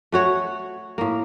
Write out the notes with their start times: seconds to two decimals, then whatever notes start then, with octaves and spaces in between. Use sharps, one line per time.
0.12 A3 F#4 C#5 F#5
0.98 A2 A#3